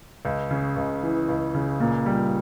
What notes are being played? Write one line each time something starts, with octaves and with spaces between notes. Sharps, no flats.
C#2
C#3
C#2
E3
C#2
C#3
A#2
G3